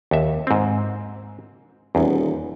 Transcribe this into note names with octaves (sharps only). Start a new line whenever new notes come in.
D#2 E5
G#2 C4
D#1 E2